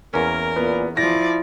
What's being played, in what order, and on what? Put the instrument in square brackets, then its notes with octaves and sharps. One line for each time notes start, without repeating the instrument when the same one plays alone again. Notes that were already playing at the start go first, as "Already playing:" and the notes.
[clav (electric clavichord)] E2 C#4 [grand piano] A#3 [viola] A#4
[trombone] A#2 [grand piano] B3
[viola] F3 D5 [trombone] E4 [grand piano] A#6